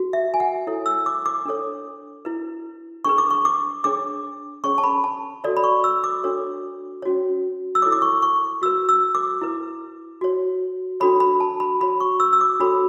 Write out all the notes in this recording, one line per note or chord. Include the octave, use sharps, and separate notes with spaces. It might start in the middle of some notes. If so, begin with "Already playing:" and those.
Already playing: F#4
E5
G#5
F#5
E4 A4 C#5
E6
D6
D6
D4 A4 C#5
E4 B4
D4 G#4 B4 C#6
D6
C#6
D6
D4 G#4 C#5 D6
C#4 G#4 C#5 C#6
A5
B5
A5
F#4 A4 C#5 D5
B5
C#6
E6
D6
D4 F#4 A4 C#5
C#4 F#4 C#5
E6
E4 A4 C#5 D6
D6
C#6
C#6
F#4 B4 E6
E6
D6
E4 B4
F#4 C#5
D4 F#4 A4 C#5 B5
B5
A5
B5
F#4 C#5 B5
C#6
E6
E6
D6
D4 F#4 A4 C#5 B5